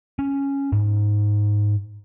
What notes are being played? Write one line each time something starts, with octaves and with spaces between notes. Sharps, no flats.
C#4
G#2